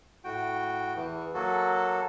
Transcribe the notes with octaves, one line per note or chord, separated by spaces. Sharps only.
A2 F#4 G5
E2 E3
F#3 A#3 F#4 A4